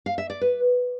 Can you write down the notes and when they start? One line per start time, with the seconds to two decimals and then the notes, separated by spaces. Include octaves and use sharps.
0.06 F5
0.18 E5
0.30 D5
0.41 B4